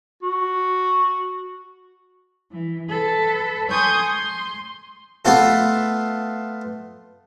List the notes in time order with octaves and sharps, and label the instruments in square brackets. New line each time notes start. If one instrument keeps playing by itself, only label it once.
[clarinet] F#4
[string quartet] E3
A4 B4
G#5 C6 C#6 D#6 G6
C6
[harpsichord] A3 B3 F4 A4